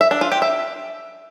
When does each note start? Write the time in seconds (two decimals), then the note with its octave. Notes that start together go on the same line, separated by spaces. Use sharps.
0.01 E5
0.11 D4
0.21 F4
0.32 G4
0.42 E5